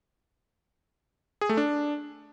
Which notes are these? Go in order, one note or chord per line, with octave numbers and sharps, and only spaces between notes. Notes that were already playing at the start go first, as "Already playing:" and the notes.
G#4
A3
D4